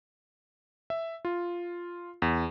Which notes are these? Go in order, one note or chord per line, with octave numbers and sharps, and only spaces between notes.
E5
F4
E2